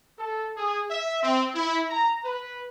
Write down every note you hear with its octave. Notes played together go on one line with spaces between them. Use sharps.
A4
G#4
E5
C4
E4
A#5
B4